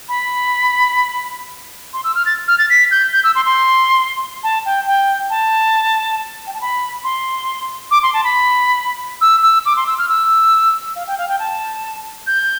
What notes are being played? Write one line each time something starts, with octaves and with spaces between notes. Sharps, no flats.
B5
C6
E6
F6
A6
F6
A6
B6
G6
G6
E6
C6
C6
A5
G5
G5
A5
G5
A5
B5
C6
D6
C6
A5
B5
E6
E6
D6
C6
E6
F6
E6
F5
G5
F5
G5
A5
G6